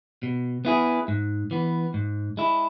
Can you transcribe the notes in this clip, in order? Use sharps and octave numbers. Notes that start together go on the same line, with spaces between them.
B2
B3 E4 G#4
G#2
E3 B3
G#2
G#3 E4